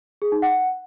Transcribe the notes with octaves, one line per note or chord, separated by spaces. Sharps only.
G#4
D#4
F#5